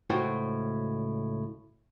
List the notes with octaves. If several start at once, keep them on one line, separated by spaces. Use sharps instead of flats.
C#2 A2 F#4 C5 G5